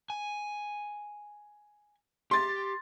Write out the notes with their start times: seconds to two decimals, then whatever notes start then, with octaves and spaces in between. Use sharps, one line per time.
0.10 G#5
2.31 G4 C6 A6